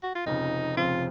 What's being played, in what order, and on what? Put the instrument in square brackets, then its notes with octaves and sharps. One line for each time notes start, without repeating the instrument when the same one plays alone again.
[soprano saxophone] F#4
F4
[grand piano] F1 F2 C#3 F3 C4 [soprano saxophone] D#4
[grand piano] F1 F2 C#3 F3 C4 [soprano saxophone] F4